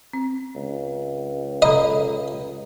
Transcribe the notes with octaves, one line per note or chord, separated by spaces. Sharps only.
C4
C#2
A4 D#5 A#5 B5